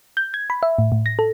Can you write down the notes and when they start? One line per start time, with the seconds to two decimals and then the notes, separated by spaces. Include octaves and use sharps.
0.17 G6
0.34 G#6
0.50 B5
0.63 E5
0.79 A2
0.92 A2
1.06 A#6
1.19 A4